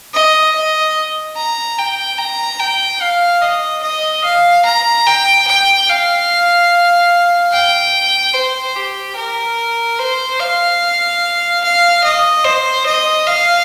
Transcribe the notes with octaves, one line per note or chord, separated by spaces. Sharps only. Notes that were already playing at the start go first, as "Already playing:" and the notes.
D#5
D#5
A#5
G5
A#5
G5
F5
D#5
D#5
F5
A#5
G5
G5
F5
G5
C5
G4
A#4
C5
F5
F5
D#5
C5
D#5
F5